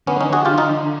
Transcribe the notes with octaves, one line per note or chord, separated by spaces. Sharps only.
D3 B3 C#4
C#4 D#4
F#4 G#4
F4 G4
D#4 F4